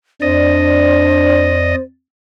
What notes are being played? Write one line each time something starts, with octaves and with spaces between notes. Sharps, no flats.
F2 D4 C5 D5 D#5